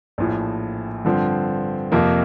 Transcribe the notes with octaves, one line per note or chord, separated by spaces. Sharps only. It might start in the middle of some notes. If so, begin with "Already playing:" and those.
A#1 A2 F3
G2 D3 F3 C4
F2 C3 F3 A#3